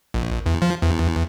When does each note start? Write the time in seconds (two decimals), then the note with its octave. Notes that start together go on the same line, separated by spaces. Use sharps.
0.14 A#1
0.46 E2
0.62 F3
0.82 E2